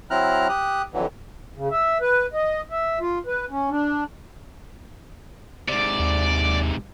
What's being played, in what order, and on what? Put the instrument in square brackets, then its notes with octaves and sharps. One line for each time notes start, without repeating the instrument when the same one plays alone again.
[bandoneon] F#3 C4 E4 A#5 F6 F#6
G4 D#6 F#6
F2 D3 E3 F#3
[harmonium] C#3
E5
B4
D#5
E5
F4
B4
C#4
D4
[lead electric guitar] G#2 C3 [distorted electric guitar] D5
[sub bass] D#2